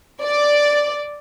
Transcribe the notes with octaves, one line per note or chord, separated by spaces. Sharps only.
D5